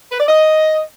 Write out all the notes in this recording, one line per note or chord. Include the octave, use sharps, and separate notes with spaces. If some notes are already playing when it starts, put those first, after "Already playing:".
B4
D5
D#5